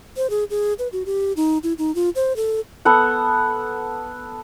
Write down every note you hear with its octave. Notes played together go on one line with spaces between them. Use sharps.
C5
G#4
G#4
B4
F#4
G4
D#4
E4
D#4
F4
C5
A4
B3 A4 F#5